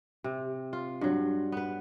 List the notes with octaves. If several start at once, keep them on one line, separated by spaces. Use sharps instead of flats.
C3
F4
G2 F#3
B3 B4